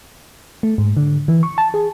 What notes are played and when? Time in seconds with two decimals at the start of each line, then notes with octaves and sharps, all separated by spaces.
0.63 A3
0.78 G#2
0.97 D3
1.28 E3
1.43 C#6
1.58 A5
1.74 G#4